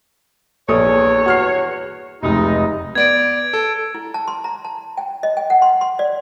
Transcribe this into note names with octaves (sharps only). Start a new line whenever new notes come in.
A#1 E2 G2 A4 C#5 D#6
F#4 F6 C7
F1 C#2 D#4
B3 D5 G#6 D7
A4
E4
A5
C6
A#5
A5
G5
D#5
G5
F#5
C6
C6
D5